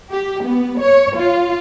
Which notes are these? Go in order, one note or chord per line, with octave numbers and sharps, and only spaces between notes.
G4
B3
C#5
F4